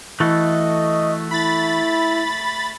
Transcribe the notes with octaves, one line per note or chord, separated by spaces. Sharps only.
E3 A3 F#4 A4 D#5
E4 B5 A6